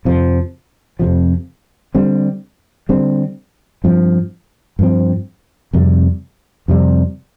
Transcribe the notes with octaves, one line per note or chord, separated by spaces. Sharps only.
F2 C3 F3
F2 C3 F3
D3 G3 C4
D3 G3 C4
G2 F3 C4
G2 F3 C4
F2 C3 G3
F2 C3 G3